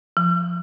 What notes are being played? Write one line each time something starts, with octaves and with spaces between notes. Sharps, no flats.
F3